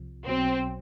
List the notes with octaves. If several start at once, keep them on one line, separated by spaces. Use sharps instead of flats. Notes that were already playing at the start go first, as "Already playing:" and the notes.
Already playing: C2 C3 F3
B1 B2 F#3 C4